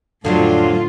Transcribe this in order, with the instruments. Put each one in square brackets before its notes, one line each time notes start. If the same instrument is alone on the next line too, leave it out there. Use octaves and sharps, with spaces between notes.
[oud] F2 F#3 D4 [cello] A2 F4 [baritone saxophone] D3